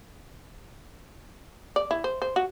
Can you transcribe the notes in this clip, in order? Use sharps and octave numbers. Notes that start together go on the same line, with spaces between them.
D5
E4
C5
C5
F#4